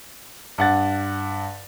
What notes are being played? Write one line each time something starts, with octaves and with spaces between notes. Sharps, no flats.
G2 F#5 A6